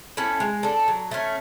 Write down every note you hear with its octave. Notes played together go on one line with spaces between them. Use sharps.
A3 C#4 E4
G#3
D4 A4
F#3
A3 C#4